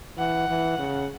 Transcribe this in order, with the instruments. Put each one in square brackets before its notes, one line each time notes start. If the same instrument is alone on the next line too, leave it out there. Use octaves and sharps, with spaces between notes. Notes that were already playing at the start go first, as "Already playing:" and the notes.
[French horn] E3 [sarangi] F#5
[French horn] E3
C#3